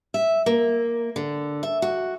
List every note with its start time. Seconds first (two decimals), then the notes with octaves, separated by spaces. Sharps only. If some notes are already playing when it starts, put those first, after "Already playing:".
0.14 E5
0.46 A#3
1.16 D3
1.63 E5
1.82 F#4